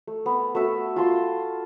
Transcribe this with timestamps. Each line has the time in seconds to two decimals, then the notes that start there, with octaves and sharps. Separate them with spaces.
0.07 A3
0.26 B3
0.55 A3 F#4 E5
0.96 F4 A5 C6